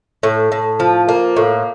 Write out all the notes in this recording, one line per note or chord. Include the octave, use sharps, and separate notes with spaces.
A2
A2
F3
A#3
A2